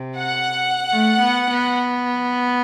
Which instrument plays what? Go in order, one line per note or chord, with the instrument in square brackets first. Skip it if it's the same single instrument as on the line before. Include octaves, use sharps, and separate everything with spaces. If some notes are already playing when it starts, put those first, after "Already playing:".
Already playing: [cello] C3
[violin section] F#5
[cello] A3
B3
B3